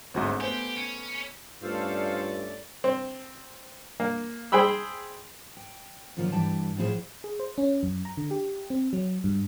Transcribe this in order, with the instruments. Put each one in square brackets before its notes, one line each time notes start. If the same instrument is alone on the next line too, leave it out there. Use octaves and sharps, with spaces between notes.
[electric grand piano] G1 D2 G#2 [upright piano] C4 F#4 D#5
[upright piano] A3 B3 C5 [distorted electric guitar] G4 [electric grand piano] G#5
[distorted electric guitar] C#4
[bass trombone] G2 [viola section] A3 C#4 D5 [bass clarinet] F4 [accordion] A4 C5 F5
[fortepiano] C4
A#3
G#4 C5 G5 B5 E6
[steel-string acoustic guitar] G5
F#2 A#2 D#3 F3 F4
G2 E3 G4 G5 A5
A2 F3 E4 F4 G#4 C5
[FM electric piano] G#4
C5
C#4
F#2
A#5
D3
G4
C4
F#3
G2